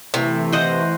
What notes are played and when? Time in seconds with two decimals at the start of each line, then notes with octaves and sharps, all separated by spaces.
0.14 C3 E3 A3
0.53 C5 D#5 F#5